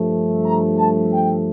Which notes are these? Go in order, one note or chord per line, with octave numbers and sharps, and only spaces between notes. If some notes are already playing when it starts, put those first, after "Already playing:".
Already playing: G2 F3 A3
A#5
A5
G5